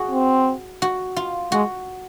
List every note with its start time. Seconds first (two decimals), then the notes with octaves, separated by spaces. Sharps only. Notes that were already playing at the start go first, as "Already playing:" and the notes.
Already playing: F#4 G#4
0.11 C4
0.82 F#4
1.16 F4
1.52 G#3 F#4